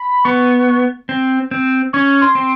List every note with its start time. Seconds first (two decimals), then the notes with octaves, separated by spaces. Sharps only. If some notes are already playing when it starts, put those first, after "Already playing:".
Already playing: B5
0.25 B3 C#6
1.09 C4
1.51 C4
1.93 C#4 C#6
2.22 C6
2.35 C4